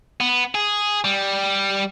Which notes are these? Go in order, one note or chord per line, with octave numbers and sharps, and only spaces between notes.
B3
G#4
G3